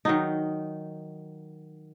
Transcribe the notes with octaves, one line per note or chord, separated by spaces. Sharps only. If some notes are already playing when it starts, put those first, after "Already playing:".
D#3 F#3 D#4